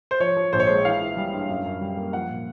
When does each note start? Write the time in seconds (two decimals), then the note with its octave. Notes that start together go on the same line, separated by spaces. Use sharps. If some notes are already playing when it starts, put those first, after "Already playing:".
0.11 C5
0.20 F3 C#5
0.37 F3
0.53 A#1 C5
0.60 C#5
0.67 G#3 C5
0.85 E3 F5
1.01 E3
1.17 G3
1.33 G2
1.49 F#2
1.66 F#2
1.81 G3
1.97 A#3
2.13 F3 F#5
2.29 A#2